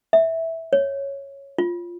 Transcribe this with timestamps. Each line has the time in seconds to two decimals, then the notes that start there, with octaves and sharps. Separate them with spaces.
0.13 E5
0.73 C#5
1.58 F4